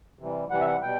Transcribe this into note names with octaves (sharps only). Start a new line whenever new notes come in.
C3 E3 G3
C3 E3 G3 F#5
E5
F#5
B2 G3 G5